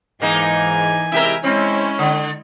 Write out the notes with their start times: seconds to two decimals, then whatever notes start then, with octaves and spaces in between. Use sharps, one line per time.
0.22 G#2 E3 A#3 D#4 G#5
1.12 C3 G#3 E4 G4 A#4 E5
1.44 G#3 C4 C#4 E4
1.99 D3